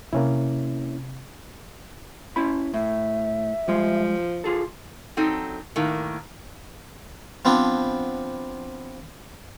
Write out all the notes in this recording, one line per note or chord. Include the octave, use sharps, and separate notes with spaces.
C3 A#3 C#4 E4
C#4 E4 B5
A2 E5
F3 G3 G#3
F4 G#4 A4
F#3 C4 D#4 A4
A2 D#3 A#3
F3 B3 C4 D4